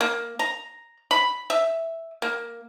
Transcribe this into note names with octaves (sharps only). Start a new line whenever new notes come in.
A#3
A#5
B5
E5
A#3